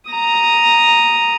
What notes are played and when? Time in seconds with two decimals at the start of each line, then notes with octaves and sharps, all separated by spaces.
0.11 A#5 D#6